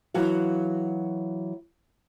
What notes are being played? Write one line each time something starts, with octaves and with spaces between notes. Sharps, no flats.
E3 F#3 F#4 F5